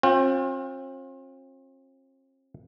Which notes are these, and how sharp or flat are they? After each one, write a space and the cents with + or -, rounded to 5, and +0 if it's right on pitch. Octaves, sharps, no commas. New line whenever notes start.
C4 +45 F4 +40 G5 +0